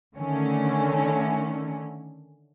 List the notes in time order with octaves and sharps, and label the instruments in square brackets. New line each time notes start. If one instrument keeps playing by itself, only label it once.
[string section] D3 D#3 A3 C#4